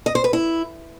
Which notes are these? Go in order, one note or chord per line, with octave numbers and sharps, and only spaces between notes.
D#5
C5
B4
E4